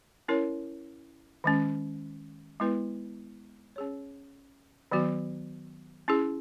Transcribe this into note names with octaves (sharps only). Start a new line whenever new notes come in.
C#4 E4 A#4 C#5
D#3 G#3 C#4
G#3 B3 E4 B4
C#4 G#4 C#5
D#3 F#3 B3 F#4
C#4 E4 G#4